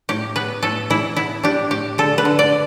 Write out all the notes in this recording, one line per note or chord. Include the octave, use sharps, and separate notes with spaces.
A2 G4
B3 B4
A2 A4
E3 E4
B3 E4
D4 G4
A2 G4
D3 A4
B4
D3
D5